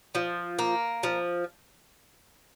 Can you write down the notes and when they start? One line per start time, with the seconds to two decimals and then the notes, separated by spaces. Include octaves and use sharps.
0.15 F3
0.59 A#3
1.03 F3